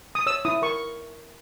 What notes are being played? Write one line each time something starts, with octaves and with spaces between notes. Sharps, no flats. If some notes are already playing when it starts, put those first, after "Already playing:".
D#6
C#5 E6
E4 D#6
A#4 C#6